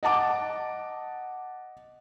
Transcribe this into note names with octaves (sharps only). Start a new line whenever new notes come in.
D#5 F#5 A5 D6